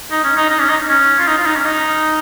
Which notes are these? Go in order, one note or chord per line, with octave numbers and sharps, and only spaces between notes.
D#4
C#4
D#4
D#4
C#4
D#4
C#4
F4
D#4
F4
D#4
C#4
D#4